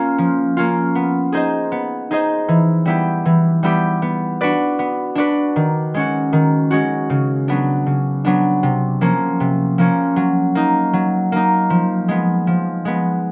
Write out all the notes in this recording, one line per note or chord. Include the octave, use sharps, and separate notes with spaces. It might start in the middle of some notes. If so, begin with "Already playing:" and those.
Already playing: A#3 C#4 F4
F3
A#3 C#4 F4
B3
D#4 G#4 C5 D#5
B3
D#4 G#4 C5 D#5
E3
G3 B3 E4 G4
E3
G3 B3 E4 G4
B3
D4 F#4 B4 D5
B3
D4 F#4 B4 D5
D#3
G#3 C#4 F#4
D#3
G#3 C#4 F#4
C#3
F#3 B3 D4
C#3
F#3 B3 D4
C3
F3 A#3 C#4
C3
F3 A#3 C#4
F#3
A#3 D#4
F#3
A#3 D#4
F3
G#3 B3
F3
G#3 B3